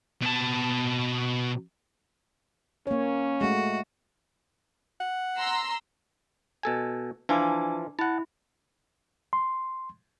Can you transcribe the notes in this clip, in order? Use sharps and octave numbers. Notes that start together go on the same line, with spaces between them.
B2 A5
A#3 C#4 C#5
G#3 A3 F#4
F#5
A#5 C6 E6
B2 A4 G#5
E3 F3 D4 F4 G#5 D6
E4 F#5 A5
C6